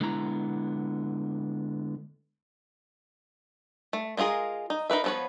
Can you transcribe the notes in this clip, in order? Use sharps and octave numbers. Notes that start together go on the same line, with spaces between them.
D3 G#3 B3 E4 A#5
A3
G#3 B3 F4 G#4 A#4
D#4
D#4 A#4 B4 E5
F3 B3 A4 B4 C#5